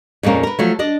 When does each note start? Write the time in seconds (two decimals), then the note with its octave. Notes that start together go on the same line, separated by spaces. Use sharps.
0.23 F2 A#2 G#3 A#3 C#4
0.43 A#4 B4
0.59 F3 F#3 A3
0.79 D4 D5 D#5